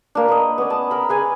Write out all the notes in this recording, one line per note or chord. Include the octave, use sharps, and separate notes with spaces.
A#3 D4
B4 D#5
B3 C#4 D5
A5
A#4 B5
G#4 B4 G#5